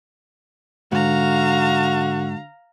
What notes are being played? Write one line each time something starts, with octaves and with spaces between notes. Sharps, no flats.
G#2 D3 F#4 F5 A#5